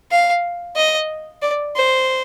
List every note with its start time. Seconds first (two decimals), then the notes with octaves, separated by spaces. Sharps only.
0.11 F5
0.76 D#5
1.42 D5
1.76 C5